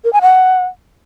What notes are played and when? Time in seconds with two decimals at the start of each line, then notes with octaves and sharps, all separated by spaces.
0.04 A#4
0.13 G#5
0.22 F#5